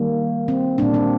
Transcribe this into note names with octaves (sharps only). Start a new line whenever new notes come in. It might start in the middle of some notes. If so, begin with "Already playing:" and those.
Already playing: D#3 G3 A#3
C4
A#2 G3 A#3 D4
C4